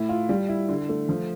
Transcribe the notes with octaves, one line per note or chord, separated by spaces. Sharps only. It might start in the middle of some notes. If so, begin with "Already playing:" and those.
Already playing: A2 E4
F4
G3
E4
D3
A3
F3